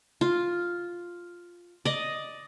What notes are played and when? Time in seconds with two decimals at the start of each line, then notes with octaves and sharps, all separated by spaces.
0.21 F4
1.85 D5 D#5